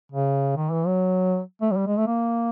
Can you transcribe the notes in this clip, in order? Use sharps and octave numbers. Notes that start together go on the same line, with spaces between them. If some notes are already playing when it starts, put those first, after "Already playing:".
C#3
D#3
E3
F#3
A3
F#3
G3
G#3
A3
A#3